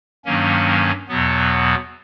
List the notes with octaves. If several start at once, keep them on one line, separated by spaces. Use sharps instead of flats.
G2 D#3 F#3 A#3 C#4
E2 B2 F#3 B3